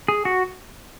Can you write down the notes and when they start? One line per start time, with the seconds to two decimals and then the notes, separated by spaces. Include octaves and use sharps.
0.08 G#4
0.25 F#4